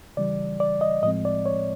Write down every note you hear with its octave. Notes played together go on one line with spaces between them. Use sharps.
C#3 E3 G3 D5
D5
D#5
A2 F3 G#3 C4 D#5
D5
C#5